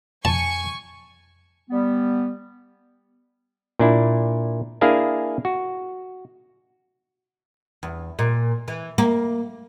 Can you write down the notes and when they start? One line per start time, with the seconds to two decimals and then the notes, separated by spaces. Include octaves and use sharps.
0.25 F2 G#5 A5 C#6
1.70 G3 B3
3.79 A#2 D4 E4
4.81 A#3 D4 E4 G#4 F5 G#5
5.45 F#4
7.83 E2
8.19 A#2
8.68 E3
8.98 A#3